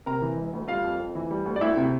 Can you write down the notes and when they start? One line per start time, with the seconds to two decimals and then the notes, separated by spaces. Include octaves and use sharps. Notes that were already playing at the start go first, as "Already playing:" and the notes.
0.06 C3 A#4 A#5
0.22 E3
0.37 E1
0.53 D2
0.68 G3 F4 F5
0.84 F2
1.00 F2
1.15 E3
1.31 G3
1.46 D2
1.56 D5
1.61 D2 E4 E5
1.77 C3